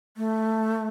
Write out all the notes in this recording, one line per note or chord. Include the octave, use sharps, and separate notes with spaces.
A3